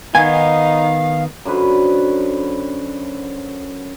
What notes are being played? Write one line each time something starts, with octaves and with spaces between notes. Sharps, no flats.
D#3 B3 D#4 F5 G#5
F#2 D3 B4 C5